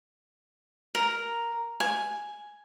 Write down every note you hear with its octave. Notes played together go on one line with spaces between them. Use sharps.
A#4
G#5